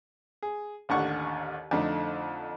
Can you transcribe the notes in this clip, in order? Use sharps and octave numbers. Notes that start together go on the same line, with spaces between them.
G#4
A1 D#2 D3 F#5 C#6
F2 D3 A3 D#4